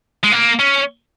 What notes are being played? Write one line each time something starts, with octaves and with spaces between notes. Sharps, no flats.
G#3
A#3
C#4